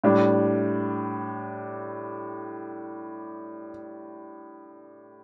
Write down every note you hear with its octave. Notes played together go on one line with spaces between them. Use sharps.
A2 G3 D4